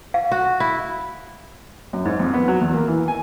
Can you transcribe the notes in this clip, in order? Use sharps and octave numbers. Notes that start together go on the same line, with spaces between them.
F5
F#4
E4
F#2
G#2
F2
B3
F#3
E2
A#3
E3
G#5